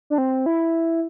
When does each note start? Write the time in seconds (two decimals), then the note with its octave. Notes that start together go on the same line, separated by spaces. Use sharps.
0.10 D4
0.18 C4
0.46 E4